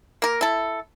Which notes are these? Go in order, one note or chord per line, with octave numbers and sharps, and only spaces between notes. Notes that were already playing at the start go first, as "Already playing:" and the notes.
A#3 A#4
E4 A4